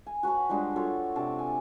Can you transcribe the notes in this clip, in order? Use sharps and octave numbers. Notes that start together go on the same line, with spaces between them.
G#5
F#4 B4 C#5 A5
F3 G3 G#3 D4
F4 F#4 A4 C#5
C3 D4 A5
G#5